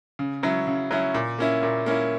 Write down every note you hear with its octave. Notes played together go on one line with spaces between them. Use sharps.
C#3
F#3 C#4 E4
C#3
F#3 C#4 E4
A#2
A#3 C#4 E4
A#2
A#3 C#4 E4